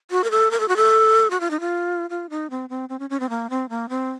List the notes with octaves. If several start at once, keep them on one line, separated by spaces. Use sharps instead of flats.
F#4
A#4
A4
A#4
A4
F#4
A4
F#4
F4
D#4
F4
F4
D#4
C4
C4
C4
C#4
C#4
C4
A#3
C4
A#3
C4